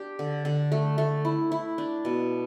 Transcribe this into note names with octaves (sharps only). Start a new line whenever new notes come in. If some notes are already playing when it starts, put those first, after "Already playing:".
Already playing: D4 G4
D3
D3
A3
A3
E4
E4
D4
B2